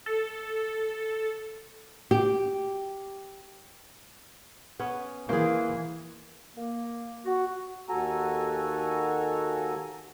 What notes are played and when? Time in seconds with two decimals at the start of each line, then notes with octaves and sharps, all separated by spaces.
0.06 A4
2.11 G4
4.79 B3 C#4
5.29 E3 A#3 G#4 C5
6.56 A#3
7.26 F#4
7.89 D#2 F#4 A4 G#5 A#5